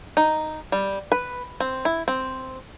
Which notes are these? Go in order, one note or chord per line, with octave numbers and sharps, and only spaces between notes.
D#4
G3
B4
C4
E4
C4